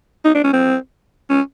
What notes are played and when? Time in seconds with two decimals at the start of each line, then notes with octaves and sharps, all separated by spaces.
0.25 D#4
0.35 D4
0.44 C#4
0.53 C4
1.30 C#4